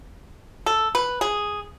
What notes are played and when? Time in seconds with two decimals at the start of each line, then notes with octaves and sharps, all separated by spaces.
0.66 A4
0.95 B4
1.21 G#4